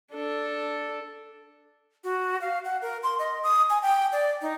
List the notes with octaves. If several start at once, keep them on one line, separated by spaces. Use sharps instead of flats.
D4 A4
F#4
F5
F#5
A#4
C6
D#5
D#6
G#5
G5
D5
D#4